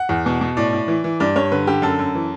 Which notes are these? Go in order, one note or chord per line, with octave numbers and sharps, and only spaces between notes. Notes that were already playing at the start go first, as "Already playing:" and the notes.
Already playing: F#5
E2
B2
B2
A2 D5
A2
E3
E3
G2 D5
G2 C#5
D3 B4
D3 G4
F#2 A4
F#2
E3